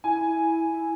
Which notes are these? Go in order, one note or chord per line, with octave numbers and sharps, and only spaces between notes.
E4 G#5
E4